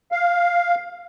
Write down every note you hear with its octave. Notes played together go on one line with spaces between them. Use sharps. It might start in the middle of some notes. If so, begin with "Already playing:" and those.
F5